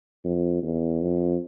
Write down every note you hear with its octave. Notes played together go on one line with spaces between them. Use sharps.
F2
E2
F2